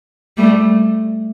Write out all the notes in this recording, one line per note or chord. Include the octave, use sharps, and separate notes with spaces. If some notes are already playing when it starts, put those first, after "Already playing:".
G3 A3